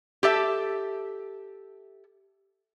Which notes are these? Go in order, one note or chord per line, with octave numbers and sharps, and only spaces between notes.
G4 A4 E5